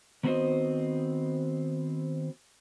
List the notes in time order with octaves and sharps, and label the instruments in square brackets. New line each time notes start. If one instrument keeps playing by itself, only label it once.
[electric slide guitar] D#3 B3 C4 F#4 C5 D#5